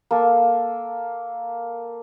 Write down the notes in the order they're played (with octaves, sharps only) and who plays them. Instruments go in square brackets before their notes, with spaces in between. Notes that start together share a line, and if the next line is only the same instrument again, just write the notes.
[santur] A#3 A4